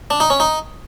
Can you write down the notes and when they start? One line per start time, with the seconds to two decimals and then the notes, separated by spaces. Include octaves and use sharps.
0.10 D4
0.20 D#4
0.30 C#4
0.40 D#4